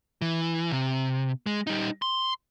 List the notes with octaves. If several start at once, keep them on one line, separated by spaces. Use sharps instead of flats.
E3
C3
G#3
G3 D#4
C6